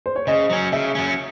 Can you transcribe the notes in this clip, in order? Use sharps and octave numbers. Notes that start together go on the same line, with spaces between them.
C5
C#5
C#3 D#5
F#3 C#4
C#3 E5
F#3 C#4